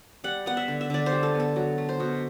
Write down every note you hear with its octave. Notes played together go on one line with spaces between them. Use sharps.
G3 F#5
B3 F#5
E5
D3
E5
D3 D5
C5
G3
A4
B3
A4
F#3
A3
C5
B2